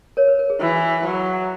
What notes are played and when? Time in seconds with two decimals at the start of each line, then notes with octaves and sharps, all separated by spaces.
0.17 A#4 C#5
0.28 B4
0.39 A#4
0.50 G#4
0.60 E3 F#4
1.05 F#3